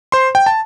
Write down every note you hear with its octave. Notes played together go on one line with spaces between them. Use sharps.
C5 C6
G5
A5